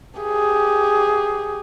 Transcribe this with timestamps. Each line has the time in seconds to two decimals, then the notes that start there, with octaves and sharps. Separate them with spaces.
0.20 G4 G#4